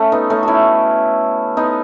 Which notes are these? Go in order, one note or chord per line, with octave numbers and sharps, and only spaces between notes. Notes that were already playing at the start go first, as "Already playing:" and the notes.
Already playing: A3 C#4
B3 D#4
A3 C#4
C#4 E4 F#4
B3 D#4